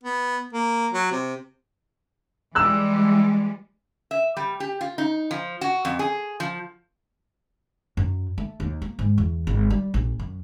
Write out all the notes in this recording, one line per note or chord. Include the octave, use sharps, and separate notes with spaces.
B3
A#3
F#3
C3
E3 G3 G#3 E6 F#6
E5
G3
G4
F4
D#4
F3
F#4
F2
G#4
F3
F#2
A3
D#2
A#3
G#2
E2
G#1
G3
A#1
F#2